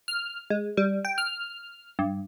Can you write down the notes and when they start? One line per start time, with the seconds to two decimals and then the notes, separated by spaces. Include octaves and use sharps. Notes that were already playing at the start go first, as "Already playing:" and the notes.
0.08 F6
0.50 G#3
0.77 G3
1.05 G5
1.18 F6
1.99 G2